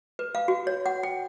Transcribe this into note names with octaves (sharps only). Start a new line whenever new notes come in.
B4
F5
F#4
C#5
F#5
G5